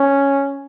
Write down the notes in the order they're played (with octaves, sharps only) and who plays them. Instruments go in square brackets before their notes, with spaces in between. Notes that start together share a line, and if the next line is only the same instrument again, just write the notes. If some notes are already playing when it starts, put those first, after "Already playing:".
Already playing: [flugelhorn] C#4